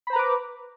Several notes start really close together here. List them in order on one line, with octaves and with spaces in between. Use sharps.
B5 C5 A#5 B4 D6